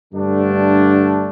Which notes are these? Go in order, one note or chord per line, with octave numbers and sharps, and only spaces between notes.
G2 D3 A3 D4